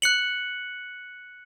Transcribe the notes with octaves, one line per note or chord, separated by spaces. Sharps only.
F#6 C#7 F#7